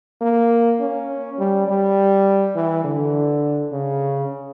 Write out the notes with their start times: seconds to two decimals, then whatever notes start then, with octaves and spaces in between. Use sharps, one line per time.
0.21 A#3
0.80 C#4
1.39 G3
1.67 G3
2.55 E3
2.84 D3
3.72 C#3